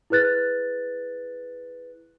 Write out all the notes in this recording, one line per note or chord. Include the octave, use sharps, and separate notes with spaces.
E4 G#4 B4 F#6 A6